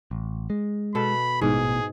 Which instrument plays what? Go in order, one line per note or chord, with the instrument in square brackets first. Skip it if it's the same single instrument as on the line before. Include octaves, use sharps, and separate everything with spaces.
[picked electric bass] A1
G#3
[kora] B2 A4 [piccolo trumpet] B5
[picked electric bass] A1 B2 E3 [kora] G#2 [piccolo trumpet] G#4